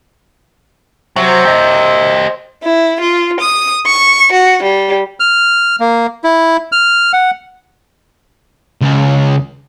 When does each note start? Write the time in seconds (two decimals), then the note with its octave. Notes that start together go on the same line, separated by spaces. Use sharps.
1.16 C3 F#3
1.45 G4 D#5
2.63 E4
3.00 F4
3.40 D#6
3.86 C#6
4.32 F#4
4.63 G3
5.20 F6
5.80 A#3
6.24 E4
6.72 F6
7.13 F#5
8.82 C#2